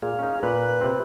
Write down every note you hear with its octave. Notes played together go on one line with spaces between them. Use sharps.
A#2 G#4 F5
C#4 D#4
A#2 B4 F#6
C3 C4